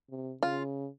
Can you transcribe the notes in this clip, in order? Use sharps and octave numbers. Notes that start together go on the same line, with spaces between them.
C3
C#3 F4